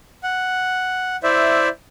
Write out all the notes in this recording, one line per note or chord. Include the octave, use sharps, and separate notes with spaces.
F#5
E4 C5 D5 E5